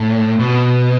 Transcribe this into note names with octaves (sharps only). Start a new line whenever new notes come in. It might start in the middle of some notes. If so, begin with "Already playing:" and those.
Already playing: A2
B2